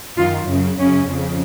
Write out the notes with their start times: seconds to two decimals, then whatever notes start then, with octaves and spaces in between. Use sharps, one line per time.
0.17 F#2 D#3 F4
0.48 F#2 C#3
0.78 F#2 C#3 C#4
1.08 F2 C#3